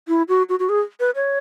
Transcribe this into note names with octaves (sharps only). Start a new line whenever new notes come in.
E4
F#4
F#4
F#4
G#4
B4
C#5